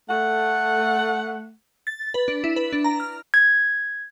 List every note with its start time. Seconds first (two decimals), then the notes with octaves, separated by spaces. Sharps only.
0.08 A3 F#5
1.87 A6
2.14 B4
2.28 D4
2.44 E4
2.56 B4
2.73 D4
2.84 A#5
3.00 F6
3.34 G#6